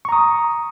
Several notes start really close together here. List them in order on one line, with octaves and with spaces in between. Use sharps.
C#6 A#5 D#6